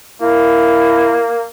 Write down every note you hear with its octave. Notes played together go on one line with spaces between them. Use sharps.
A#3 E4